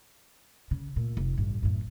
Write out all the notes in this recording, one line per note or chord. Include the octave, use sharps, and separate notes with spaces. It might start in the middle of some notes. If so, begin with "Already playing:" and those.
C#3
A#2 A3
F1
A1 G2
F#2 A2